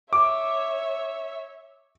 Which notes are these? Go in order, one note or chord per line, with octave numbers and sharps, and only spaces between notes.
C#5 E5 D6